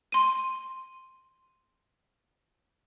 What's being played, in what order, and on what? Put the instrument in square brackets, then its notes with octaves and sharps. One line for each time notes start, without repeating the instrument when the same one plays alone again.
[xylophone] C6 D#7